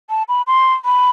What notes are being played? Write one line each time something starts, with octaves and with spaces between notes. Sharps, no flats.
A5
B5
C6
B5